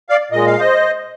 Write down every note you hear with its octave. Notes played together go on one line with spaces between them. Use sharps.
D5 F5
A#2 G#3 D#5
F5
C5 D#5